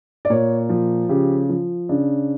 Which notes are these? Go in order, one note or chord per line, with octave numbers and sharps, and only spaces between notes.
D5
A#2 C#5
F3
C#3 G4
F3
C#3 D4